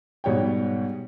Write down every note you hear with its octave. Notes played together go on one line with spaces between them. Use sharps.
G#2 B2 G3 C#5 G5